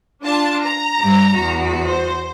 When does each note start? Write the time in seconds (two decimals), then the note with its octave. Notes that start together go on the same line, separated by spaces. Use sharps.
0.22 D4 F4 A5
0.64 A#5
0.98 G2 G3
1.36 E2 F#4
1.86 C5